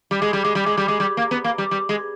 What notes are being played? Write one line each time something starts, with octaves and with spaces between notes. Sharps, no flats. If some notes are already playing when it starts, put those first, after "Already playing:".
G3
G#3
G3
G#3
G3
G#3
G3
G#3
G3
A#3
B3
A#3
G3
G3
G#3